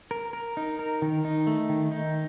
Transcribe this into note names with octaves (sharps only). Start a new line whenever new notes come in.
A#4
A#4
D#4
A#4
D#3
D#4
A3
D#3
D#4